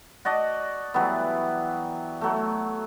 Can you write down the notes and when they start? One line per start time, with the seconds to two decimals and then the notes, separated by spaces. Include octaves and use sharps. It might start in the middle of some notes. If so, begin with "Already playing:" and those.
0.25 F#4 D5 D#5 A5
0.94 E3 F#3 G3 B3
2.21 F#3 A3